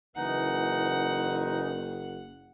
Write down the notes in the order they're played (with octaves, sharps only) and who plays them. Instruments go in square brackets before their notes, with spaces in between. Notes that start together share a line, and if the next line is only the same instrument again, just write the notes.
[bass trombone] F#1 [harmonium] E3 [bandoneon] D#4 [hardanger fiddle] F#5